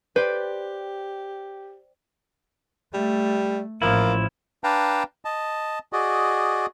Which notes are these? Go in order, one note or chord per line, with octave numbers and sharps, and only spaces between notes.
G4 B4 C5 D5 G5
G3 A3
A1 F3 A#3 E4
D4 B4 F5 G5 A5 A#5
D#5 A5
F#4 G#4 D5 D#5